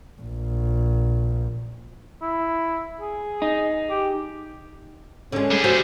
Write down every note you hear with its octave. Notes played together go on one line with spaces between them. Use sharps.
A#1
E4
G#4
D#4
G4
D3 G#3 C#4
G3 G#4
F#3 C5